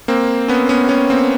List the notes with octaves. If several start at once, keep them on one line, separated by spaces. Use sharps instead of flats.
A#3 C4
B3 C#4
B3 C#4
B3 C#4
A#3 C4